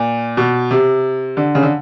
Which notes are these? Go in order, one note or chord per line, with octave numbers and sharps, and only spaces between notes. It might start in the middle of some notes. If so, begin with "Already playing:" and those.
Already playing: A#2
B2
C3
D3
C#3
D3